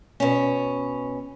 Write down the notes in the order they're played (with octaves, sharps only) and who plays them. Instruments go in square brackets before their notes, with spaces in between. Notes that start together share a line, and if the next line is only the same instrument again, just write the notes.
[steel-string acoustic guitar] B2 C#4